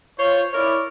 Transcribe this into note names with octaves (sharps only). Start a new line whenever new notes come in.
F4 C5 C#5
E4 A#4 C#5 D5